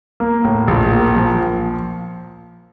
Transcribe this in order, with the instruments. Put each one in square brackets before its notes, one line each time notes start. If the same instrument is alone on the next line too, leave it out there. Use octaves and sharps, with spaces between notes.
[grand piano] A#3
A2
A#1
A#3
F3